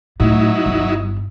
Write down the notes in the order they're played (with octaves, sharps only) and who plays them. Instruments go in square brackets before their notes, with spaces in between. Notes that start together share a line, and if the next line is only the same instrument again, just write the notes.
[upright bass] A2 [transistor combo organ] F#3 D#4 E4
[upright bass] G1